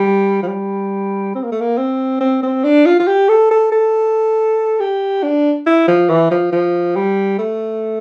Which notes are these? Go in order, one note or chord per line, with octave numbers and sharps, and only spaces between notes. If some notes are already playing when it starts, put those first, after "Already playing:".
Already playing: G3
F3
G3
C4
A#3
A3
A#3
C4
C4
C4
D4
F4
F4
G4
A4
A4
A4
G4
D4
E4
F3
E3
F3
F3
G3
A3